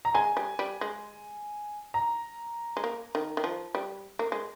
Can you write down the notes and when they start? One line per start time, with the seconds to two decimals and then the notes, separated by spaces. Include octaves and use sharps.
0.05 A#5
0.14 G#3 G#5
0.37 G3
0.59 G3
0.81 G#3
1.94 A#5
2.77 G#3
2.84 A#3
3.15 D#3
3.37 D#3
3.44 F3
3.75 G3
4.19 A#3
4.32 G#3